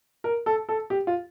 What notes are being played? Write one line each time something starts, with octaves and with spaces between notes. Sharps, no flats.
A#4
A4
A4
G4
F4